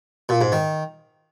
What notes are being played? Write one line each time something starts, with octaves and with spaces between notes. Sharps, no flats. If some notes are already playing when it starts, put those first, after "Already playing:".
A#2
G#2
D#3